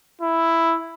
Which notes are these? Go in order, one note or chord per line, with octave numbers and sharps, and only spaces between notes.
E4